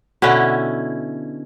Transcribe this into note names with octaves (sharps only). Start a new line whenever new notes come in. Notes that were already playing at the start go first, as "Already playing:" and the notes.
B2 D3 C#4 E4